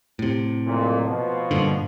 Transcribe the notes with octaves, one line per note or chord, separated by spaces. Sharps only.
A2 C3
B1 F2 A#2
B2 F3
G2 A#2 D3